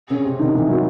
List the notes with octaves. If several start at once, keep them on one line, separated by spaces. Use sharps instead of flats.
C#3 C#4
C3 C4
D#3 D#4
E3 E4
F#3 F#4